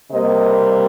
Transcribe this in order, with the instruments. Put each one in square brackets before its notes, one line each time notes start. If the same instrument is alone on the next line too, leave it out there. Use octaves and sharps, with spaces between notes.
[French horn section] C3 G3 A#3 D#5